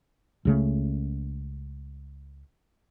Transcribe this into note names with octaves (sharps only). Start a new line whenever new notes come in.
C#2 C#3 A3